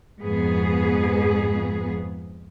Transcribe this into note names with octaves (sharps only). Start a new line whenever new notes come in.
F2 G#2 B3 G#4